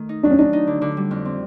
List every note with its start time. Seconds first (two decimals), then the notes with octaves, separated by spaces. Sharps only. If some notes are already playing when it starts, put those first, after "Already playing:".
Already playing: D#3 A3
0.09 D#4
0.23 F#3 D4
0.31 C#4
0.38 D4 D#4
0.53 D#4
0.67 D3
0.82 D3
0.97 G3
1.11 F2
1.25 C4